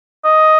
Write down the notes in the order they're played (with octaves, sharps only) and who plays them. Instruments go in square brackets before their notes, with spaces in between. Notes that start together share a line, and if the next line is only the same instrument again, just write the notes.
[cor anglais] D#5